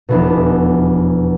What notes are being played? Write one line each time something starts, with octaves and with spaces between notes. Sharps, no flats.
F1 E2 B2 B3 D4